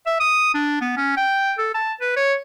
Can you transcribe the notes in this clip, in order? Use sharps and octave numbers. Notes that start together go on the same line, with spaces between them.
E5
D#6
D4
B3
C#4
G5
A4
A5
B4
C#5